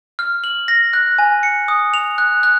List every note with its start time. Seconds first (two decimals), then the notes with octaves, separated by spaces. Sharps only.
0.19 F6
0.44 F#7
0.68 A#6
0.93 F#6
1.18 G#5
1.43 C#7
1.68 D#6
1.94 F7
2.18 F#6
2.43 F#6